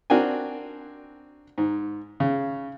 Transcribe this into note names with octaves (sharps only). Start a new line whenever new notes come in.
C4 D4 F#4 A#4 G5 G#5
G#2
C#3